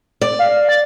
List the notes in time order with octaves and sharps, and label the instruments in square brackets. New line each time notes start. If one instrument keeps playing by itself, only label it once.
[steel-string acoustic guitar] D5
[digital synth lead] F5
A6